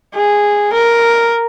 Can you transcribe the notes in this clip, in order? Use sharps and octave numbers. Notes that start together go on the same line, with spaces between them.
G#4
A#4